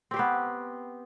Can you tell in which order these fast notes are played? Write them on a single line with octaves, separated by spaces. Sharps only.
C4 G4 C5 B3